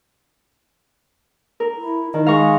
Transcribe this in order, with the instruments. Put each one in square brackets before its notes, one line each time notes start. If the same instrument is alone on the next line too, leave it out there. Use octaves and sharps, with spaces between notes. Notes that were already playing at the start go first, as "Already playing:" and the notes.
[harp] A#4
[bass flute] E4
[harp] D#3 [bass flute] A#4
[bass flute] G#3 [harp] F5 A#5 C#6